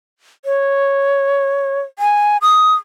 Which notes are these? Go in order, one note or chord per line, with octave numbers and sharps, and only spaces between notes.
C#5
G#5
D#6